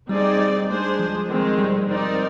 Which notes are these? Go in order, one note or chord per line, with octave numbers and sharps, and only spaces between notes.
G3 C4 D#4 G#4 D5
G3
G#3 D4 G#4 C5
F3
D#3 G#3 C4
G3
C4 D#4 A#4 D5